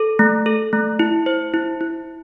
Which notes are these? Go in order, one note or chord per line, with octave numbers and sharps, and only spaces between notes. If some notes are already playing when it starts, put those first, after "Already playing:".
Already playing: A4
A3
A4
A3
E4
C5
E4
E4